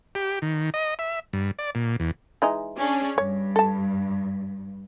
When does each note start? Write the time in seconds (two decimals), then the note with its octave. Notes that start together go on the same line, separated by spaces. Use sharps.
0.15 G4
0.42 D#3
0.74 D#5
0.99 E5
1.33 G2
1.59 D5
1.75 A#2
2.00 E2
2.42 E3 G#3 D#4
2.78 C#4 D4 G#4
3.18 G2 C#5
3.56 A4 A5